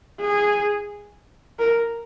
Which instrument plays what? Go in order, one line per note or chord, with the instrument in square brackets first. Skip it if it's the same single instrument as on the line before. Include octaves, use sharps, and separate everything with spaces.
[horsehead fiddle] G#4
A#4